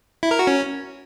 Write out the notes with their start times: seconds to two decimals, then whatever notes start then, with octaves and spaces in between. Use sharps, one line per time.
0.23 E4
0.31 A#4
0.39 F#4
0.47 C#4